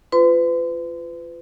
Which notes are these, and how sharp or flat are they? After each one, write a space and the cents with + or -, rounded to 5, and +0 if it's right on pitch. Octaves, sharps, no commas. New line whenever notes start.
F4 -15 B4 +35 C6 -30